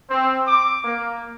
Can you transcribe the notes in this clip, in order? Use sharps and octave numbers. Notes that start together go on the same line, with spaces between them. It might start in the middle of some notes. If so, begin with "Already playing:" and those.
C4
D6
A#3